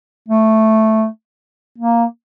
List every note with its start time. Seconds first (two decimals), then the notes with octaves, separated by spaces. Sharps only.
0.28 A3
1.78 A#3